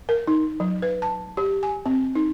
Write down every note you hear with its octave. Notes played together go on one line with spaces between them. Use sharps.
A#4
D#4
F#3
B4
A5
G4
G#5
C4
D#4